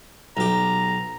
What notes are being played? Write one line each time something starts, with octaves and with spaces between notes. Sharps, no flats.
B1 G4 A#5